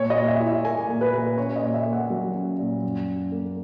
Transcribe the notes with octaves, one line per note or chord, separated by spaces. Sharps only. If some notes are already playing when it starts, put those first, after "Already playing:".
Already playing: A#2 C#5
D#5
A#2
E5
E4
E5
A#3 G#5
A#2
B4
A#2
C#4 C#5
D#5
A#2
E5
A#3
F#5
F#3
C#4
A#2
F#2
F#2
A#3